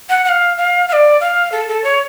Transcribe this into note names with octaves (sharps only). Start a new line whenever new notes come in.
F#5
F#5
F5
F5
F5
D5
F5
A4
A4
C#5